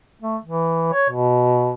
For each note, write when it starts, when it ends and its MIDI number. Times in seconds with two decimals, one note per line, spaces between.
0.22 0.37 57
0.45 0.92 52
0.93 1.09 73
1.10 1.73 47